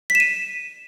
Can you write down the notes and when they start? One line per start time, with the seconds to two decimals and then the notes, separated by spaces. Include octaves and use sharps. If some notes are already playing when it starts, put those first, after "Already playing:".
0.10 B6
0.15 E7
0.20 D#7